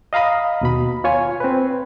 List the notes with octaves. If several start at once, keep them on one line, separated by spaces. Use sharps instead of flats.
D#5 F5 A#5 B5 D#6
D#2 B2 B5
F4 C#5 G#5
C4 B4